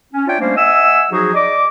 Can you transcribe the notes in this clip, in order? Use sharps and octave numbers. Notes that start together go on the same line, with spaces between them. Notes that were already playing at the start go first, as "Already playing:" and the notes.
C#4
D4 F4 C#5 D5 E5 G5
G3 A3 A#3 C#4 D4 C5
D#5 E5 F#5 G#5 E6
F3 F#3 D#4 F#4 G#4
D5 D#5 D6